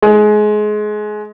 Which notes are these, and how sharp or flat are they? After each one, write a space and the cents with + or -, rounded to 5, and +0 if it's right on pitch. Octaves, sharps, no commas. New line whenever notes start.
G#3 +25